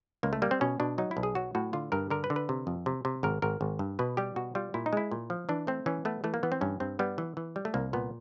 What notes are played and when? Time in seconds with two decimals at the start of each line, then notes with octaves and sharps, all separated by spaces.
0.23 C#2 A#3
0.33 A3
0.42 G3 A#3
0.51 C4
0.61 B2 C#4
0.80 B2 D4
0.98 F#3 D#4
1.11 E4
1.17 B1
1.23 G#4
1.35 F#3 F#4
1.55 A2 F#4
1.73 D3 F4
1.92 G2 A#4
2.10 D3 A#4
2.24 B4
2.30 D3
2.36 B4
2.49 C3
2.67 F2
2.86 C3
3.05 C3
3.23 G#1 A#4
3.42 G#1 A#4
3.61 G#1
3.79 G2
3.99 B2 B4
4.17 G3 G4
4.36 B2 F#4
4.55 G3 F4
4.74 A#2 E4
4.86 D#4
4.93 G#3 E4
5.11 A#2
5.30 F3
5.49 E3 D4
5.67 A3 C4
5.86 E3 C#4
6.05 A3 B3
6.24 E3 A3
6.34 A#3
6.43 E3 B3
6.52 C4
6.61 G2 C#4
6.80 G2 C4
6.99 G3 B3
7.18 E3
7.37 E3
7.56 G3
7.65 A3
7.74 C2 A#3
7.93 A#2 B3